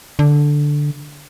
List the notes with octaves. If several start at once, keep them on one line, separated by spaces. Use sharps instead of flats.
D3